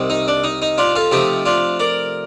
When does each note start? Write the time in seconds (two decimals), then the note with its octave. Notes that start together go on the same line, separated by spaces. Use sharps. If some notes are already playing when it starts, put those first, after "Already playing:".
Already playing: C2 C3 D#3
0.10 D#4
0.28 D4
0.44 D#4
0.62 D#4
0.78 D4 F4
0.95 F4 A4
1.11 C3 F3 A3 D#4 G4
1.45 D4 F4
1.80 A#4 D5